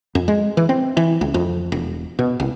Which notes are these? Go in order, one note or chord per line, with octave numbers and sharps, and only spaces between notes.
F2
G#3
E3
C4
E3
C#2
F2
E1
B2
C2